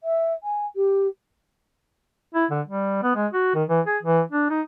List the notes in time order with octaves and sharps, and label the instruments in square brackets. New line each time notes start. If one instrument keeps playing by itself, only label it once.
[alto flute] E5
G#5
G4
[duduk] E4
D3
G3
B3
G#3
F#4
D#3
E3
G#4
E3
D4
D#4